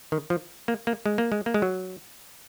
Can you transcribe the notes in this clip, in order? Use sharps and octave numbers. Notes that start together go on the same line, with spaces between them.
D#3
F3
A#3
A#3
G#3
A#3
G#3
A#3
G#3
F#3